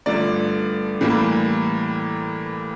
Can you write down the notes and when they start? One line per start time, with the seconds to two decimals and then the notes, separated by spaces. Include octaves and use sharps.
0.06 G2 D3 F3 A3 D5
1.01 A2 E3 G3 A#3